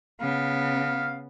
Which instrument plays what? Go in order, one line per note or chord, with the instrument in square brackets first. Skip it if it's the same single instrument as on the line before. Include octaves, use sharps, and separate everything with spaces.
[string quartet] C#3 [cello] B3 [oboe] F5